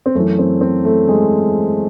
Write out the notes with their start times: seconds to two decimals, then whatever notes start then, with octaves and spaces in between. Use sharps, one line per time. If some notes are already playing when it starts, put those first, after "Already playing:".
0.06 C4
0.15 F#2 E3 A3
0.39 C4
0.61 C4
0.85 A3
1.08 G#3